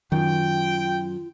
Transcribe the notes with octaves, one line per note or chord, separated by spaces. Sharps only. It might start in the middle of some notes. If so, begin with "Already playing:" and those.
F#2 D#3 F4 G5